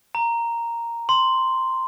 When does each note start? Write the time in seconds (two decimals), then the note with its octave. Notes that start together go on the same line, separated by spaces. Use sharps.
0.15 A#5
1.09 C6